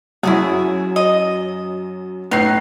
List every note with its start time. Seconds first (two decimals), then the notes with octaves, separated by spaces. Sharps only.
0.23 F#2 E4 F#4 G#4
0.96 D#5
2.31 A2 B3 D#4 E4 C7